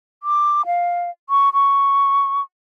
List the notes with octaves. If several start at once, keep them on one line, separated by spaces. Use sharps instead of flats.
D6
F5
C#6
C#6